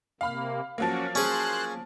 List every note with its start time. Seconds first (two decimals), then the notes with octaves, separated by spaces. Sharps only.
0.21 C3 A#3 F5 B5 F6
0.78 F3 F#3 A#3 C#4 F#4
1.15 C#4 G#4 C5 F#6